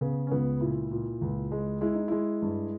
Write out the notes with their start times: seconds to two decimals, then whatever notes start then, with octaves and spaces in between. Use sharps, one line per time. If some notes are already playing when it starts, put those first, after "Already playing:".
0.01 C#3 B3
0.27 C#4
0.31 C#2 B3
0.61 A#2 E4
0.91 A#2
1.21 C#2
1.52 G#3
1.81 G#3 E4
1.94 D#4
2.08 G#3 E4
2.42 G2